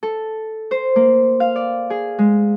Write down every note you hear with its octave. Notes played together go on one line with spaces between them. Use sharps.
A4
C5
A#3
F5
D5
G#4
G#3